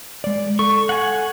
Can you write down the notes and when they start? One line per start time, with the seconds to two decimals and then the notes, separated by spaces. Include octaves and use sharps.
0.24 G#3 D5
0.59 A4 C#6
0.89 F#5 G#5